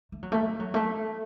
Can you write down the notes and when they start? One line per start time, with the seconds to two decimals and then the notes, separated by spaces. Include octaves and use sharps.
0.12 A3
0.23 F#3
0.32 A3
0.46 A3
0.60 F#3
0.74 A3